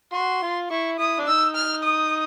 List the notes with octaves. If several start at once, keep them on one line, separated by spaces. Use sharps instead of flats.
F#4 C6
F4
E4 C#6
E4 D#6
D4
D#4 E6
F6
D#6